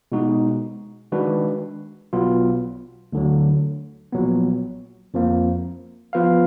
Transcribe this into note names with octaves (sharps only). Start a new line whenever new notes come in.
B2 G#3 D#4 F#4
D#3 G#3 D4 F#4 B4
B1 B2 F#3 B3 F4
D2 D3 F#3
A#1 A#2 F#3 B3
F2 F3 A#3
F3 B3 F4 B4 F5